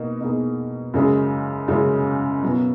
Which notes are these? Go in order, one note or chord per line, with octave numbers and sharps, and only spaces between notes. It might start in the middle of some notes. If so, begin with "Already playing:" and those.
Already playing: B2 A#3 D#4
B2 A#3 D#4 G#4
F#2 C#3 G#3 C#4 G#4
F#2 C#3 G#3 C#4 G#4
B2 F#3 B3